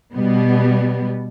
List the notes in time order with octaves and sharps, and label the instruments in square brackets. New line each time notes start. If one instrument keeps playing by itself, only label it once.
[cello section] B2 G3 B3